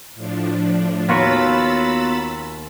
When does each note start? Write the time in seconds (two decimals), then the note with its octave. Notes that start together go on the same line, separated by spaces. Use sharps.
0.15 A2 F3 D4
1.09 D#2 B3 F4 F#4 C#5 B5 E6 A6